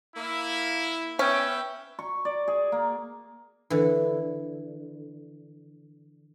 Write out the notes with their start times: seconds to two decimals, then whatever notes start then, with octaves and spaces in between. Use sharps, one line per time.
0.16 A#3 E4
1.19 B3 C#4 E5 G5
1.99 C#6
2.25 D5
2.48 G#4
2.72 A#3
3.70 D3 E3